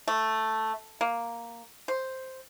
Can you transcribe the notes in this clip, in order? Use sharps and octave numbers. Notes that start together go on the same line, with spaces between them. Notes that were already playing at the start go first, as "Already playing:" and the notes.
A3
A#3
C5